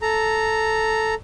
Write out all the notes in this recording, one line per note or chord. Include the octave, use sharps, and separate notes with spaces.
A4 A#5